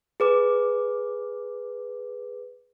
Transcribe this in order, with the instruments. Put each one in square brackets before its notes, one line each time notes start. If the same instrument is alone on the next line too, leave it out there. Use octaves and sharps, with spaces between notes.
[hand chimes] G#4 B4 D6